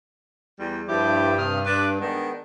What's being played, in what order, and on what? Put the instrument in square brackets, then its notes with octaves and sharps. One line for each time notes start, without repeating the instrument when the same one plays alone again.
[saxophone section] E2 G3
[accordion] G2 [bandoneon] F3 E4 D6 [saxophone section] G3 G4
[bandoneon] C3 D#6 F6
[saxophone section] D4 B4 [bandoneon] D6
[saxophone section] D#3 G#3 D4 [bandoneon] B3